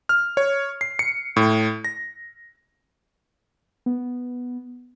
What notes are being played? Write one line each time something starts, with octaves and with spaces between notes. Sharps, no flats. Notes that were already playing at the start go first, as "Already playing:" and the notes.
F6
C#5
C7
C#7
A2
A#6
B3